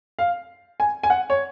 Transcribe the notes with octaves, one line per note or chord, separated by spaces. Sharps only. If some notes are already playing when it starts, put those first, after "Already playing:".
F5
G#5
G#5
F#5
C#5